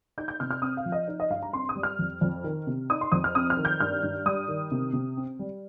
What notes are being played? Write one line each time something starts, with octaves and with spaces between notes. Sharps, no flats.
D#4 G6
G6
C3 F6
F6
C4 D#6
F5
F3
D#5
D#4
D#5
G2 F5
A#5
C4 C6
D#6
G3
F6
F2
F2
D#3
C3
D#4 D#6
C6
F2 D#6
F6
C4 D#6
F6
D#3
G6
G2 F6
G2
G3 D#6
D#3
C3
C3
C4
G3